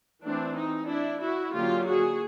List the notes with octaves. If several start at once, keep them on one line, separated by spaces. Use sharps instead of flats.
E3 A3 C4 D4
D#4
D4 E4
E4 F#4
D3 F#3 A#3 C#4 F4 G4
F#4 G#4